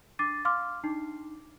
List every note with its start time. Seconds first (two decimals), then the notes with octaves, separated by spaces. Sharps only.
0.19 D4 D6 A6 C7 D#7
0.45 F5 C6 D6 F6
0.84 D4 D#4 C7